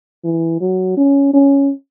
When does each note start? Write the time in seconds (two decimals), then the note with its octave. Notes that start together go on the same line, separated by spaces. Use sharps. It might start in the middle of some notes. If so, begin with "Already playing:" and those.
0.24 E3
0.61 F#3
0.97 C#4
1.34 C#4